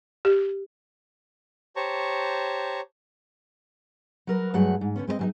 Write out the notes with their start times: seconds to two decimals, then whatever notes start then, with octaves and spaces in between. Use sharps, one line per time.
0.25 G4
1.76 G4 C5 C#5 A5 A#5 C#6
4.27 F#3 A#4 B4
4.54 G2 F#3 A3 F#4 G#4 F#5
4.81 G#2
4.96 D3 E3 B3 C#4
5.07 G#3 C4 B4 D#5
5.19 F#3 G3 D#4